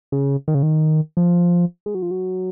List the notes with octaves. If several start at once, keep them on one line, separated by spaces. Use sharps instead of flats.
C#3
D#3
C#3
D#3
F3
G#3
F#3
F3
F#3